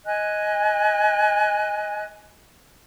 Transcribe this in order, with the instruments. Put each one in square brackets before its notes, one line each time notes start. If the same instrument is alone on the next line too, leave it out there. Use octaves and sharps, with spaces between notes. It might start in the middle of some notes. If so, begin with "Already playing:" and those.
[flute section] D#5 G#5 F#6